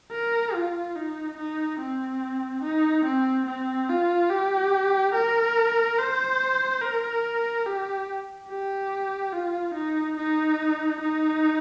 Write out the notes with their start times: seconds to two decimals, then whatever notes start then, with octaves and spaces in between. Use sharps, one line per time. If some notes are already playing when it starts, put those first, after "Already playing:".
0.12 A#4
0.54 F4
0.96 D#4
1.38 D#4
1.80 C4
2.64 D#4
3.05 C4
3.47 C4
3.89 F4
4.31 G4
5.14 A#4
5.98 C5
6.81 A#4
7.66 G4
8.49 G4
9.32 F4
9.75 D#4
10.17 D#4
11.01 D#4